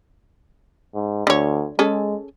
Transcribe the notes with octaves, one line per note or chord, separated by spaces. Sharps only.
G#2
D2 D3 C#5
G#3 C#4 G#4 A4